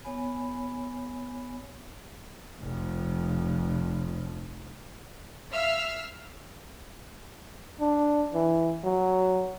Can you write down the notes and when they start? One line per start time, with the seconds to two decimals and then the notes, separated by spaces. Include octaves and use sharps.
0.04 B3 C#5 G#5 B5
2.62 F1 F3
5.50 E5 F5 E6 F6 C7
7.81 D4
8.34 E3
8.84 F#3